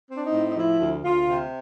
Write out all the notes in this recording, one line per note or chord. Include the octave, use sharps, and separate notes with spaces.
C4
D4
D#4
A2
D#4
F3 E4
D2
D2 F4
C3